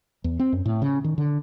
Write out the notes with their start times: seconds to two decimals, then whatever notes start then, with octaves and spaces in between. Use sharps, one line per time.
0.24 E2
0.40 C4
0.53 F#2
0.66 A2
0.82 C#3
1.04 D#3
1.18 D3